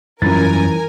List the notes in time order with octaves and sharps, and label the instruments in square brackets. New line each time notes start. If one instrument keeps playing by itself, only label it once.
[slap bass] F#2 G3 [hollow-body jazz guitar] E3 F4 [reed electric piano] C#4 A6 [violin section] A#4 G#5